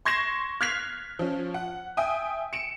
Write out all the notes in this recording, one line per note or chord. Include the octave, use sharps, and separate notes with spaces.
C6 C#6 G#6 A#6 C7 E7
F6 F#6 G#6 B6 C7 F7
F3 C#4
F#5
E5 G5 G#5 D#6
C#7 D7 E7